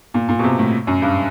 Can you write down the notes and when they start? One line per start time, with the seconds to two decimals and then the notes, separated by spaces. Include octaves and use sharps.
0.14 A#2
0.29 A#2
0.39 B2
0.44 C3
0.59 A2
0.87 F#2
1.02 G2